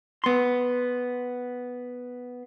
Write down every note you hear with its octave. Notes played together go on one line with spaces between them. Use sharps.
B3 C6